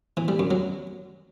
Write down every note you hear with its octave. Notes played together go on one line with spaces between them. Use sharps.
E3
G3
F#2
F#3